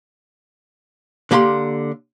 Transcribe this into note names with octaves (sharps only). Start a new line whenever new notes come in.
D3 A#3 G4 A#5 C6